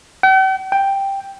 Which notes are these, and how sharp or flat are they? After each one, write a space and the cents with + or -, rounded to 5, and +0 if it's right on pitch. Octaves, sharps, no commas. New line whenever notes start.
G5 -45
G5 +5